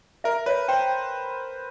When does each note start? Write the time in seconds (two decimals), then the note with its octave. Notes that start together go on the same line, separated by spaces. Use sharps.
0.24 A#4 E5
0.46 B4 C#5
0.68 C5 G5